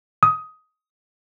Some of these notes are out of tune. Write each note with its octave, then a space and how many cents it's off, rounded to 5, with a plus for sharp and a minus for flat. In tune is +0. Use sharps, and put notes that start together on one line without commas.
D#6 +15